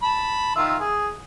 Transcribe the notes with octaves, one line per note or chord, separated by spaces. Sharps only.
A5 B5
D#3 F4 E5
G#4